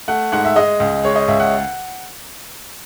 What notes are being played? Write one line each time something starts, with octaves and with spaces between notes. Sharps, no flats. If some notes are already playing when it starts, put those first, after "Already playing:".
A3 F#5
G#2 F#5
E5
G#3 D#5
C#2
G#3 C#5
D#5
C#2 E5
F#5